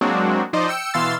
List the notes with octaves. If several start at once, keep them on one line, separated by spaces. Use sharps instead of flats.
F#3 G#3 A#3 C4 D4 F#4
F3 D#4 C5 D5 D#5
G5 E6 C#7
B2 E3 F5 C6 E6 A6